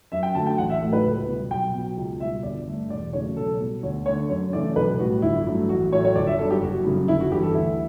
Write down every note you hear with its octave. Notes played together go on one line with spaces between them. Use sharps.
F#2 E5
G5
D3 F#3 A3 A5
G5
A1 F#5
E5
A2 F#3 A3
B4
C#2
B2 G3
B1 G5
B2 F#3
C#2
B2 G3 E5
G1 D5
G2 D3 A3
E1 D5
E2 C#3 F#3 A3 C#5
B1 A4
B2 G3
D2 C#5
D3 A3 C#5
F#2 C#5
C#3 E3 A3 D5
B1 B4
A2 G3 F#4
G1 E4
G2 F#3 A3
A1 F#4
A2 F#3 A3 C#5
C#5
G1 D5
E5
G2 F#3 A4
G4
F#1 F#4
F#2 C#3 G3
G1 E4
F#4
G2 E3 G4
A4
D2 E4